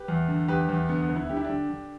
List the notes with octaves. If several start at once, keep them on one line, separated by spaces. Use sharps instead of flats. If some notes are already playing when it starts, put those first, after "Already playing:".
Already playing: G4 B4
E2
D3
E2 G4 B4
E2
D3 B3
B3
D2
B3 E4
D3 G4
E4
D3 D4 G4
D3